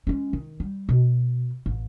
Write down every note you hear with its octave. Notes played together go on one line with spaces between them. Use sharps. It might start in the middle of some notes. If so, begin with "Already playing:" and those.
G#3 C#4
D#3
G3
B2
A1